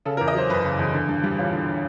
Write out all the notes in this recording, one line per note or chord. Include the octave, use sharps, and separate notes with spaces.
C#3 A4
A#4
E2
D#5
F#3 C5
F#1 B4
C#3
E2
D3
G2
G3
A1 F4
D3